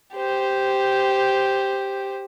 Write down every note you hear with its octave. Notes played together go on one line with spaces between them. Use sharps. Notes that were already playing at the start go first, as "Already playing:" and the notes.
G4 C5